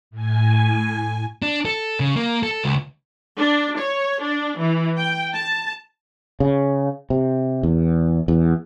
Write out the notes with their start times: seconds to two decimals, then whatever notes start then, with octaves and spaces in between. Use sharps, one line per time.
0.11 A2 G#5
1.42 D4
1.65 A4
2.00 C#3
2.16 A#3
2.43 A4
2.64 C#2
3.37 D4
3.78 C#5
4.21 D4
4.58 E3
4.97 G5
5.34 A5
6.40 C#3
7.10 C3
7.63 E2
8.28 E2